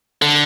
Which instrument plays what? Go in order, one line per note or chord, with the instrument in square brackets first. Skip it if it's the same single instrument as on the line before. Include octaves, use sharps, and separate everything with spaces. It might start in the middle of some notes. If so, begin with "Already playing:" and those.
[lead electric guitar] D3